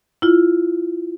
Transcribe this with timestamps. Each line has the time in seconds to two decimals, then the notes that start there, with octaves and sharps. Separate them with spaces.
0.22 E4 F4